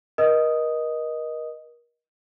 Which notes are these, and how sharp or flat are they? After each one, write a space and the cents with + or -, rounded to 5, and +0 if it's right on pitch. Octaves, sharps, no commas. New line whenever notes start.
A#4 +35 D#5 +0 D#6 +0